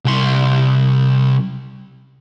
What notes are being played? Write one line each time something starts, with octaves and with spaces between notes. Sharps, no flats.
C2 C6